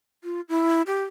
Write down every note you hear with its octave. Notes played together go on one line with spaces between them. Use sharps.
F4
E4
G4